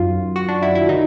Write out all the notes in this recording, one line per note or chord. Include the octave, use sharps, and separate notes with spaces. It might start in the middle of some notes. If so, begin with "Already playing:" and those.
Already playing: F#2 D#3 F#3 F4
F#4
D4
E4
E4
D#3 F#3 D#4